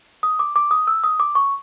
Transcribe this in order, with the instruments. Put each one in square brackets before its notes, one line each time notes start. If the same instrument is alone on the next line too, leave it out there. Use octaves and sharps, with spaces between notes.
[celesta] D#6
D6
D6
D#6
E6
D#6
D6
C#6